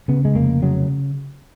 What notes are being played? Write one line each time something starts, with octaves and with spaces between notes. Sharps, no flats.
C#3 B3
G#3
F1 A#3
C#3 F#3